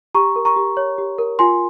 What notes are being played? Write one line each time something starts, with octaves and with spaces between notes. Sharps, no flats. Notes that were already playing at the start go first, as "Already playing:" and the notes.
G4 A#5 C#6
A#4
A#5 C#6
G4
C#5
G4
A#4
F4 G#5 C6